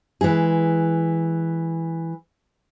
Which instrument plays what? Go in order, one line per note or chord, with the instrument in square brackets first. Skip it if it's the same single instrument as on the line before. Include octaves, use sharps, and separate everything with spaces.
[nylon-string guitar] E3 G#3 E4 G#4